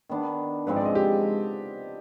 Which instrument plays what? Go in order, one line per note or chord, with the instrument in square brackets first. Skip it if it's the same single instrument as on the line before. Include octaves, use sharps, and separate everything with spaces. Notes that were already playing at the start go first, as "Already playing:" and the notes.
[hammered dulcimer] D#3 B3 D4
[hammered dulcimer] G#2 F3 G#3 C4 [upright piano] B4
[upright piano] D5
D#5
G4